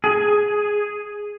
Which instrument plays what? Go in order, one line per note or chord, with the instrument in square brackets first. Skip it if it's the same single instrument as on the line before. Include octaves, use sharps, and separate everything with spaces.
[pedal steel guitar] G#4